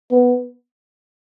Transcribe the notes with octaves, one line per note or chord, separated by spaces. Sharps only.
B3